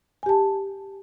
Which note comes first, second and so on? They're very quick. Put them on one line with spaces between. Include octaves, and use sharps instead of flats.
G#5 G4 A5